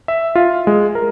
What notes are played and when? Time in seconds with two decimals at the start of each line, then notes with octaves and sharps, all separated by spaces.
0.08 E5
0.35 F4
0.67 G#3
0.95 A#4